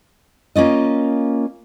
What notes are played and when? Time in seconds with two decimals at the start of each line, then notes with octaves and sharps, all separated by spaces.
0.56 A#3 C#4 F4 D#5